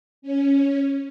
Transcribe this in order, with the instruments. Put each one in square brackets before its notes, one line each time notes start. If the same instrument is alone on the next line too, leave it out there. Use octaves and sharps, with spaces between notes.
[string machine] C#4